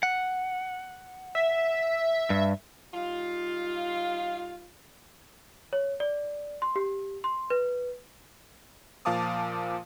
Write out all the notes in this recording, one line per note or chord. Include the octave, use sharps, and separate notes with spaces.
F#5
E5
G2
G3 D#4 F4
C#5
D5
C6
G4
C6
B4
A#2 F3 F5 A5 D6 D#6